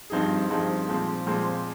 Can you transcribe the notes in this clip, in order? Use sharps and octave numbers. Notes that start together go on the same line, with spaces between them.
G2 F3 C4 D#4 G#4
G2 F3 C4 D#4 G#4
A#2 F3 G#3 C4
A#2 F3 G#3 C4